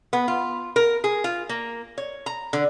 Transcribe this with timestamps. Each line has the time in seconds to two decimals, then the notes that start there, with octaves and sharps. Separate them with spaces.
0.13 B3
0.28 F4
0.76 A#4
1.04 G#4
1.24 F4
1.49 A#3
1.98 C#5
2.26 A#5
2.53 D3